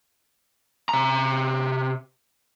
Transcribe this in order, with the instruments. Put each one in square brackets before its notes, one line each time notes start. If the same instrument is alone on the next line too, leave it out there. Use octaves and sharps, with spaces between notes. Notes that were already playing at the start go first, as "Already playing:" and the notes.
[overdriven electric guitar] C3 A#5